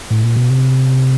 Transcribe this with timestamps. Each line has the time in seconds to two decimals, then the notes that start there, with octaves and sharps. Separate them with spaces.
0.10 A2
0.23 A#2
0.36 B2
0.50 C3